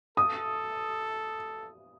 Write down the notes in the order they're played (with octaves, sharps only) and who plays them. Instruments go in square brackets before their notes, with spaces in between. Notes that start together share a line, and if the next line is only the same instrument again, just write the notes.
[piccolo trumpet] A4 [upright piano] D#6